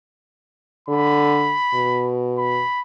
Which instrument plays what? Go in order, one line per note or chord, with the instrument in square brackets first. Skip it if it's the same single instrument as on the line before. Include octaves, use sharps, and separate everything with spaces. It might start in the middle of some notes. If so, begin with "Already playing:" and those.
[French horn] D3 [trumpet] B5
[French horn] B2
[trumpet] B5